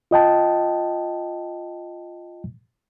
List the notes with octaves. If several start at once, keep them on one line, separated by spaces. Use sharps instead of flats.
F4 D#5 G5 A5